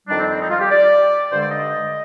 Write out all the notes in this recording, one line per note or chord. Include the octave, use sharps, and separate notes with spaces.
F2 D#3 G3 D4
C4
C4
D#4
F4
G4
D5
G2 D3 G#3 C5
D5
D#5